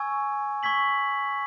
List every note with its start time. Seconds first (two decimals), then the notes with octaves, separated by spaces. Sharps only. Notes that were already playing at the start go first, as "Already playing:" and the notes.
Already playing: G#5 C#6 E6 G#6
0.63 C#6 E6 G#6 B6 F#7